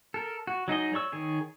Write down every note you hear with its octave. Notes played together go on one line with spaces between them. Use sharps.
A4 A#4
F#4
F#3 D#4 G#4 D#5
C#5 D5 C#6 E6
D#3 G#4 C#5